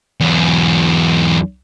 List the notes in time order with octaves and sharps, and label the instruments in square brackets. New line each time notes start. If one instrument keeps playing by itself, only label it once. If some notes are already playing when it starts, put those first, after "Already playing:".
[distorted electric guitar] E2 F#3